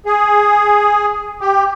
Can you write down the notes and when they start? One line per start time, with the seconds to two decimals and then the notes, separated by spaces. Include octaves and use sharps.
0.06 G#4
1.41 G4